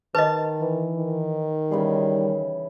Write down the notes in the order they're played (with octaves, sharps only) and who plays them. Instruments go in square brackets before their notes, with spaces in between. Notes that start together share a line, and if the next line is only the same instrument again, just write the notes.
[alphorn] D#3 [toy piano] B4 D#5 [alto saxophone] A5
[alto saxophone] E3
[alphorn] D#3
[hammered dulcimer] C#3 E3 G#4 [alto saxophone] G3